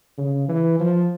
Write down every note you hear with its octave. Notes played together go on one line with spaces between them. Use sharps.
C#3
E3
F3